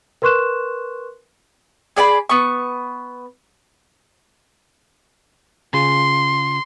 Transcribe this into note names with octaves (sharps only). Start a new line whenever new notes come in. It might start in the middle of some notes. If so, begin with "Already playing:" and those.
A#4 B4 C6 C#6 F#6 E7
G#4 D5 G#5 B5
B3 C#6
C#3 F4 G#4 C6